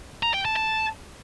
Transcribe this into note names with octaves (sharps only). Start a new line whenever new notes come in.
A#5
G5
A5
A5